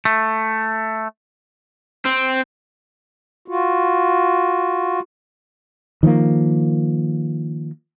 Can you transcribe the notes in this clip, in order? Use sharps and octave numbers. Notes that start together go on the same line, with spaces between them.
A3
C4
F4 F#4
D#3 F3 G#3 A#3